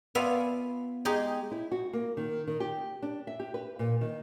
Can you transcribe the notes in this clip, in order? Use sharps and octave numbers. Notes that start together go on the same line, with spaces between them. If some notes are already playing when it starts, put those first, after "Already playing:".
B3 F4 D5 E5 F5 G#5
G#3 D#4 G4 G#4
E4
F#4
A#3
D#3
D#3
G4
D4
E5
G4
B4
A#2
D#3